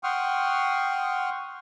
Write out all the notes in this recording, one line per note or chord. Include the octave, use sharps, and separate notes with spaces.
F#5 G5 C6 C#6 D#6 F6